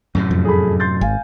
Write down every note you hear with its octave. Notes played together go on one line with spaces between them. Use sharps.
F#2 A2 C3
F2
G#4 A4 B5
C6 G6 A6
G#1 F5 G#5